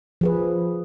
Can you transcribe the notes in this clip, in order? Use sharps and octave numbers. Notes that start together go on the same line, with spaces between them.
F3 G#4 B4